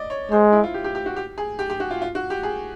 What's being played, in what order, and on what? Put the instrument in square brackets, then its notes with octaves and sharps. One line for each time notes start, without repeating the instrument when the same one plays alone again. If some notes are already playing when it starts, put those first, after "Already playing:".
Already playing: [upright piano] D5 D#5
C#5
[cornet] G#3 [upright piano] C5
[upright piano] E4
F4
G4
G4
G4
F#4
G4
G#4
G4
G4
F#4
F4
F4
F#4
G4
G#4